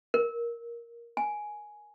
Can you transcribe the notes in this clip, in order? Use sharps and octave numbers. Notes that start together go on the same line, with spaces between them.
A#4
G#5